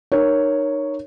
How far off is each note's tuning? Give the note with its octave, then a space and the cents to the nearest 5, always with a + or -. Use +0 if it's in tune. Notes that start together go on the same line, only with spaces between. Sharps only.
D#4 -30 A#4 +0 C#5 +0